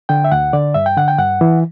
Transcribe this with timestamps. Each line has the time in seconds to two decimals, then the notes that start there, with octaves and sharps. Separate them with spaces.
0.09 D3 G5
0.24 E5
0.32 D2 F#5
0.53 D3 D5
0.74 G2 E5
0.86 G5
0.96 D3 F#5
1.08 G5
1.18 G2 F#5
1.41 E3